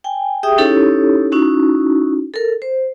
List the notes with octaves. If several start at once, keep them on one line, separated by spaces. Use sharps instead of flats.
G5 G#5
G4 G#4 E5 G5 D#6
C#4 D#4 E4 G4 A4 C#5
C#4 D#4 E4 F#4
A4 A#4
C5